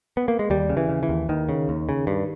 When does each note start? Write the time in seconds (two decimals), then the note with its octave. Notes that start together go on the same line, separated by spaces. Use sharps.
0.17 B3
0.28 A#3
0.39 G#3
0.50 D#2 G3
0.69 C#3
0.77 E3
0.89 C#3
1.03 E3
1.09 D#2
1.29 D#2 D#3
1.49 C#3
1.69 D#2
1.89 C#3
2.07 G2